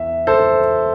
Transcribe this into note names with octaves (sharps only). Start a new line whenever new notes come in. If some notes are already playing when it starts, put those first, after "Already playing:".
Already playing: E2 E5
A4 C5